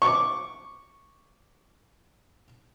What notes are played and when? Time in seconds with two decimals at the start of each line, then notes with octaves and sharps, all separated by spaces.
0.02 C#6 D6